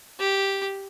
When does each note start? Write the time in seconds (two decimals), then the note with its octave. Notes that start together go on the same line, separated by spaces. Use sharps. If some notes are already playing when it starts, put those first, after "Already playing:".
0.20 G4